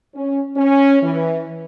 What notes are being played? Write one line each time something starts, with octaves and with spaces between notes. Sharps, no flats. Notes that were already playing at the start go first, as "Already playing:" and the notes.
C#4
C#4
E3